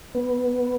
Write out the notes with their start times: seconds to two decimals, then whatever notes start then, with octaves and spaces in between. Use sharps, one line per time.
0.15 B3